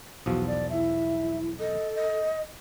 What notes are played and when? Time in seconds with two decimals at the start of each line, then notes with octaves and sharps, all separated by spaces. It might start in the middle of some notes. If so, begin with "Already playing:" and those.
0.26 B1 E2 F3 F#4
0.47 D5
0.70 E4 E5
1.59 A4 D#5
1.94 D#5